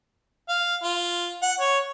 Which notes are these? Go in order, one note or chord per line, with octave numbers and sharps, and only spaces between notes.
F5
F4
F#5
C#5